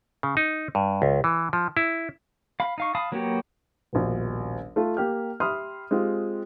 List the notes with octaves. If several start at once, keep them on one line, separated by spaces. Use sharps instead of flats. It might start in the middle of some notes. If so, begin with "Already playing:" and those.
C#3
D#4
G2
C#2
E3
F3
E4
F5 B5
D#4 F5 C#6
F5 A5 B5 D#6
F#3 A#3 B3 F#4 G4
D#1 A#1 B2
A3 F4
A#3 G4 F6
G4 E5 B5 C6 D#6 F6
G#3 C4 F4 G4